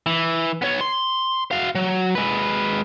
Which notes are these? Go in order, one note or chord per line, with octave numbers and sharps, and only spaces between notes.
E3
B3 C#5
C6
F#4 F5
F#3
G#3 B4